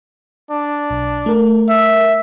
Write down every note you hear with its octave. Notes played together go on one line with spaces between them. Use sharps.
D4
B1
A3 A#4
E5